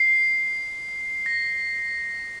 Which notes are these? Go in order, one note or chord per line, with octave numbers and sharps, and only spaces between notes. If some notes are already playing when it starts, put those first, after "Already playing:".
Already playing: C7
A#6